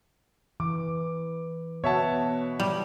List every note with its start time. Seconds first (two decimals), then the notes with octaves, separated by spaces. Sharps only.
0.60 E3 D6
1.84 B2 B3 C#5 E5 F#5 A5
2.60 G3